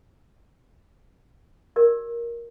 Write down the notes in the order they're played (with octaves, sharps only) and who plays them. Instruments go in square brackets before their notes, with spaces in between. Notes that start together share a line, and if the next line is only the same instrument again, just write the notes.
[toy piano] F#4 A#4 D5